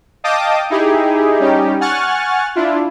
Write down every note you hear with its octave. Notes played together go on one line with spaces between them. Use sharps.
D#5 F5 G5 A5 D6 D#6
D#4 E4 G4 G#4
G3 C#4 D#4 G4
F#5 G#5 C#6 F6 F#6 A6
D4 E4 F4